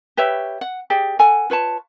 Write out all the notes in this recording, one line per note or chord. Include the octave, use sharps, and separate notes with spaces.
G4 B4 C#5 E5
F#5
G4 G#4 D5
A4 F#5 G#5
F4 B4 C#5 A5